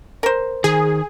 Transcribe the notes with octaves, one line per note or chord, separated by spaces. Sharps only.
A#4 C5
D#3 G#4